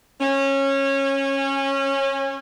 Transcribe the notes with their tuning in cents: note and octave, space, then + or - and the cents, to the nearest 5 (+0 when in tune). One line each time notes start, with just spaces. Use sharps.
C#4 -20